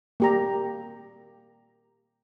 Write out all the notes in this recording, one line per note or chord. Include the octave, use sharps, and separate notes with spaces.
A#3 G4 A#5